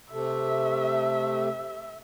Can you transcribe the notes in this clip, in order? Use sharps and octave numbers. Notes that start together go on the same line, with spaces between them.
C3 A3 E5